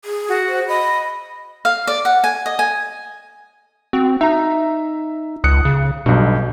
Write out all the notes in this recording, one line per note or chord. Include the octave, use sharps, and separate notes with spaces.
G#4
F#4
C5
D#5 B5
F5
D5
F#5
G#5
D#5
G#5
C4 F#4
D#4 E5 A#5
C#2 D#6 F#6 C#7
C#3
B1 G2 B2